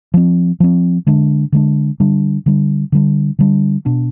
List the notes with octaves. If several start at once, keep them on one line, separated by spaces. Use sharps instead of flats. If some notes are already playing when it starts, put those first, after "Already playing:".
F3 C4
F3 C4
D3 G#3 D4
D3 G#3 D4
D3 G3 D4
D3 G3 D4
D3 G3 D4
D3 G3 D4
B2 B3 D4